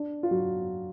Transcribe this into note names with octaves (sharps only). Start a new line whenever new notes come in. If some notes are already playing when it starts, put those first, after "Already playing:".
Already playing: D4
F4
F#3 F#4